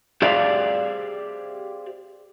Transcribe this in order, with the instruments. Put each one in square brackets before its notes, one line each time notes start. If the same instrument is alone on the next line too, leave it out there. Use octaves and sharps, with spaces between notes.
[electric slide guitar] G4 G#4 C5 D5 E5 F5